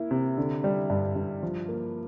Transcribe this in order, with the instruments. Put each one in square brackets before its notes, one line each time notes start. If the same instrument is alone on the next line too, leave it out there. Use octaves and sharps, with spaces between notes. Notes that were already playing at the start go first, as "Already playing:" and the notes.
Already playing: [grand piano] A#3 E4
C3
D3
G3
G2
G2
F3
A#3